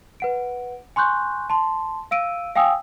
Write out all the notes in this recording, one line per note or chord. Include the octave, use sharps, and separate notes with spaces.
B4 F#5 D7
G#5 C6 C#6 F#6 G6
A5 C6
F5 E6 D7 D#7
F5 G5 G#5 D#6 E6